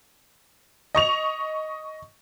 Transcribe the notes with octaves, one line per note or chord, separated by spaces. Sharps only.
D#5 C#6 F7